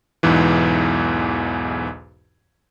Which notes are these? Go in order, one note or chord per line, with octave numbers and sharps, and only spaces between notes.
B1 E2 G#2 E3